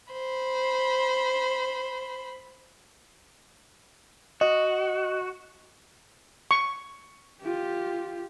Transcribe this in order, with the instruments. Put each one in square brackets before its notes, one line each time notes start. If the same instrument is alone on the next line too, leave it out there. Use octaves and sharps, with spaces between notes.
[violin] C5 B5
[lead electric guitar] F#4 [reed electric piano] D#5
[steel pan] C#6
[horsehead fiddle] F4 G4